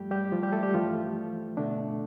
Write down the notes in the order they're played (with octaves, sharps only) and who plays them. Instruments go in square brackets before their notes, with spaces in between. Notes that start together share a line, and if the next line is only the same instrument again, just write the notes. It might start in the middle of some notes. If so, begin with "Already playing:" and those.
Already playing: [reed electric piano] G2 F3 G3 A3 G4
G3 G4
F3 F4
G3 G4
A3 A4
G3 G4
G2 E3 F3 A3 F4
B2 D3 A3 D4